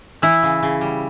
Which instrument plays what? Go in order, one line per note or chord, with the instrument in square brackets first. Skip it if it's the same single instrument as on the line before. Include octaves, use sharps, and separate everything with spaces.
[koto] E3 E4
C#3
C#3
G3